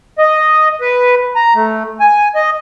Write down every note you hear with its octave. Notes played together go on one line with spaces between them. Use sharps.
D#5
B4
A#5
A3
G#5
D#5